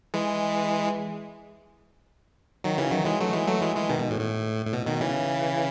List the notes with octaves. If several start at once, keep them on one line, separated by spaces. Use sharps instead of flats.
E3 G#3
D#3 F#3
C#3 E3
D#3 F#3
E3 G#3
F#3 A3
E3 G#3
F#3 A3
E3 G#3
E3 G#3
B2 D#3
B2
A2
A2
A2
B2
B2 D#3
C#3 E3